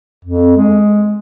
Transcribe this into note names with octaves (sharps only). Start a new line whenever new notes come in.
F2
G#3